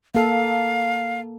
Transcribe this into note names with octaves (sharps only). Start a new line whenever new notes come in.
A#3 A4 F5